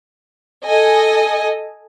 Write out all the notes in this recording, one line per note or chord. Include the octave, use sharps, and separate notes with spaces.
A4 D#5 G#5